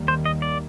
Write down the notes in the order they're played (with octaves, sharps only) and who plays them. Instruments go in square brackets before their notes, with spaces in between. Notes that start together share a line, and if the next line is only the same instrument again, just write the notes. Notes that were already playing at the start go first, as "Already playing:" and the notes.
Already playing: [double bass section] D#2 D#3 G3 A#3
[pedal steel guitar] C5
D#5
D5